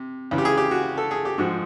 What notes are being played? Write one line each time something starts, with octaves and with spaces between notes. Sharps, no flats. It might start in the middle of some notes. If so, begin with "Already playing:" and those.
Already playing: C3
C#2 C#3 E3
G4
G#4
G4
F#4
A4
G#4
G4
G#2 F3 F#4